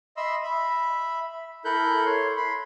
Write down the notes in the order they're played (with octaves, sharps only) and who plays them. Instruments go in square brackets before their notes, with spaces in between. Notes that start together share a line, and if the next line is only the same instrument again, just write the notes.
[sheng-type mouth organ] D#5 E5 B5 C6 E6
E5 B5
E4 A4 A#4 B5 F#6 G6
C#5 C6
B5 C6